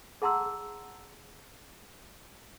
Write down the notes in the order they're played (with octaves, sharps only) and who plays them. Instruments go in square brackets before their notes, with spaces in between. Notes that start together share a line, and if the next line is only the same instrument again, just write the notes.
[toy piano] G#4 F#5 A5 A#5 C6 E6